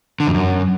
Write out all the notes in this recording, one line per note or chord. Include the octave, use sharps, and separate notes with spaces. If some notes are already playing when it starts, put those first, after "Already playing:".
D3
F2
F#2